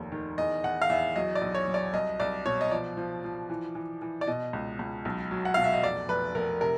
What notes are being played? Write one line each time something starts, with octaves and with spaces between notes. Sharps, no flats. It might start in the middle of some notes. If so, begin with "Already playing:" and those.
Already playing: F1 D#2
D#3
E2 D#5
E2 F#5
F5
E2 E5
F#3 D#5
D5
B1
C#5
F#3
D5
C2 D#5
C2 D5
B2 C#5
D#5
F3 D5
F3
F3
E3
E3
E3
D5
B2 D#5
C#2
C#2
B1
F#3
F#5
B2 F5
E5
D#5
F1 D5
F1 B4
F1 A#4
C3 A#4